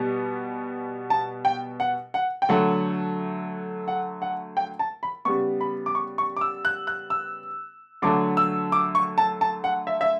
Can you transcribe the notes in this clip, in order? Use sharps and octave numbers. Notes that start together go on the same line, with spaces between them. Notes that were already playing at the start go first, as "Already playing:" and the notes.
Already playing: B2 G3 B3
A5
G5
F#5
F#5
G5
D3 F#3 A3 F#5
F#5
F#5
G5
A5
B5
C#3 G3 B3 C#6
B5
D6
C#6
C#6
D6
E6
F#6
F#6
E6
D3 F#3 A3 D6
E6
D6
C#6
A5
A5
F#5
E5
E5